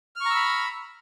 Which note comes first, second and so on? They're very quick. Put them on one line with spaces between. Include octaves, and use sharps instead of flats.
F6 C#6 A#5 E6 B5